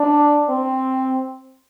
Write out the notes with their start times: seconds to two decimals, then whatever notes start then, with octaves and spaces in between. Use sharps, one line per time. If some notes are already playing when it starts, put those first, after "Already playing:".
Already playing: D4
0.49 C4